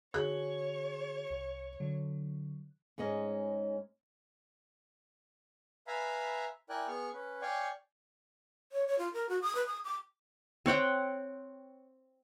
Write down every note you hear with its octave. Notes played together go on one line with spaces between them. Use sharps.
D3 F#4 G#4 C#5 F#6
C2 C#7
D3 F#3
G#2 G#3 C#4 D#5
B4 E5 F5 G#5 A#5 B5
E4 A#4 D5 G5 G#5 F#6
B3 G#4 C#6 F6
C#4 B4
C#5 D5 F5 G5 G#5 C#6
C#5
C#5
F4
A#4
F#4
D#6
B4
D#6
D6
C4 C#5 F#5 G5